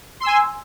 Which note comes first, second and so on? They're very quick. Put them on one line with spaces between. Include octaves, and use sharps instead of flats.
C6 E6 G#5